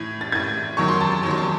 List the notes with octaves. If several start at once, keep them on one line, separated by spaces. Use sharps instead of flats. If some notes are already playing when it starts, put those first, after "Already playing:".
Already playing: A2 E3 G#6
A6
A2 E3 G#6
E2 D#3 F#3 C#6
C6
A5
A5
E2 D#3 F#3 C6
C#6
C6